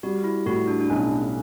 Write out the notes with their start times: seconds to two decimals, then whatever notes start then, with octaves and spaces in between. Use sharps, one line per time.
0.03 G3 F#4
0.24 E4
0.46 A2 F#4
0.68 D4
0.81 D4
0.90 B1 C#4